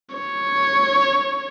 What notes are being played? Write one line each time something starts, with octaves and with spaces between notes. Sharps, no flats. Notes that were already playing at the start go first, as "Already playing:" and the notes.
C#5